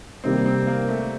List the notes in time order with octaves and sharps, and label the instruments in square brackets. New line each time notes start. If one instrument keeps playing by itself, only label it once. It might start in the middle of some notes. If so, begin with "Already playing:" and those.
[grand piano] C3 D#3 G3 A#3 [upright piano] C4
[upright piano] C4
A#3
A3